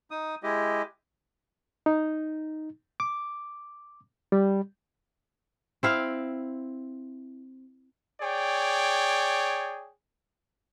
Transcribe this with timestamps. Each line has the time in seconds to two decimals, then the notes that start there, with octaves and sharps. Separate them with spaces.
0.11 D#4 D#6
0.43 G#3 E4 G4 D#5
1.86 D#4
3.00 D6
4.32 G3
5.83 C4 E4 F5
8.21 G#4 C#5 D5 G5